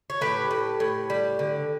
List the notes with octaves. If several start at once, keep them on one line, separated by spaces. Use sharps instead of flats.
C#5
A2 G4 B4
A2
A2
G3
D3